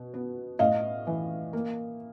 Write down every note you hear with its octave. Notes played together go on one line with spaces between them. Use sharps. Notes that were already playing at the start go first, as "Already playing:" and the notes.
Already playing: B2
B3
A2 D#5 F5
E3
A#3